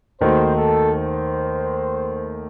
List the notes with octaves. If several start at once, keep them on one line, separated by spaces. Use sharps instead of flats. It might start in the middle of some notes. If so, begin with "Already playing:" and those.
D#2 D#3 A3 D#4 F#4 C5
A4
C5